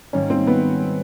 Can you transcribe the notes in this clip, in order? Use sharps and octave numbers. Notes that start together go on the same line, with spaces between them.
G#2 D#3 G3 A#3 C#4
C4
B3